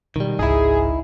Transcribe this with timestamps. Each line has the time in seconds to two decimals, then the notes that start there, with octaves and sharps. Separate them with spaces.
0.16 B2 D#3 G3 G#3
0.39 G#1 C#2 G#2 D#4 E4 G#4